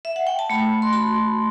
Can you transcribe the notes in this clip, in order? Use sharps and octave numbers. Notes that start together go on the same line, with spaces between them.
E5
F#5
G5
A5
A3 B5
C6
F#4 B5